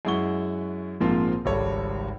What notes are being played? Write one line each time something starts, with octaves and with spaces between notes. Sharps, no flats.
F#2 G#3 E4 F#5 C#6 G7
A#1 G#2 F3 A#3 C4 F4
G#1 C#2 G3 A4 C#5